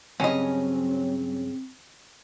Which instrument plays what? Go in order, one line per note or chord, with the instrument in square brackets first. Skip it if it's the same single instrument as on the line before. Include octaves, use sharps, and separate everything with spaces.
[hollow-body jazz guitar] G2 C#3 [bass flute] F#3 [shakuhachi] C4 [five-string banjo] C#4 D#5